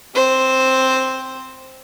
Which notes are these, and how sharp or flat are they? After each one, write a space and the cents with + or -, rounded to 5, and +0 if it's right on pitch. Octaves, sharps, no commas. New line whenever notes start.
C4 +0 C5 +0